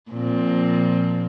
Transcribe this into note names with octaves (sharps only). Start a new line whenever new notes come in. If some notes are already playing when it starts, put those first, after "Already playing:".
A#2 F3 C4